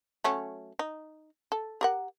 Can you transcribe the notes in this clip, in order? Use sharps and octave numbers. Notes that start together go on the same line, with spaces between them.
F#3 A3 C#4
D#4
A4
G4 A#4 F#5